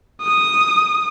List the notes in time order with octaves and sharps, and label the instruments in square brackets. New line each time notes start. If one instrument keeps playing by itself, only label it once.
[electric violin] D#6